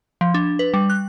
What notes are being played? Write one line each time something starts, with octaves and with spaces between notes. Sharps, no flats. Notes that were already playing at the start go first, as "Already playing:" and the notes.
F3
D4
B4
G3
F#6